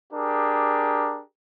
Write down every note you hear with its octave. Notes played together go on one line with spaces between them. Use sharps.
D4 G4 G#4 A#4